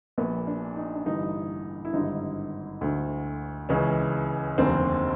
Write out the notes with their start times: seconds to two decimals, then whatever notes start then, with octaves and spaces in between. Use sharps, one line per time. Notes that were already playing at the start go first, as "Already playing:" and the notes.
0.18 A#1 A#2 B3
0.47 D4
0.76 D#4
0.95 D4
1.06 A1 G2 D3 D#4
1.85 E4
1.93 G#1 G2 D3 D#4
2.81 D2 D3
3.69 C#2 C#3 E3 C#4
4.58 F1 D#2 D3 C4